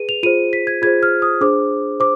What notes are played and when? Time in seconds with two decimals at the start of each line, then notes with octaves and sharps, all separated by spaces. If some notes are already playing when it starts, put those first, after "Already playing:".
Already playing: G#4 B4 D#7
0.09 F7
0.23 F4 G#4 C5 D#7
0.53 B6
0.67 G#6
0.82 F4 G#4 C5 G#6
1.03 F6
1.22 D#6
1.41 D4 G#4 C5 D6
2.00 C5 D6